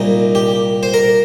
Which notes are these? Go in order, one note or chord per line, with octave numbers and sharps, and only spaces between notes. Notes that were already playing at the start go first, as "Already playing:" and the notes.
Already playing: C2 A#2 D#4
G4
C5
A#4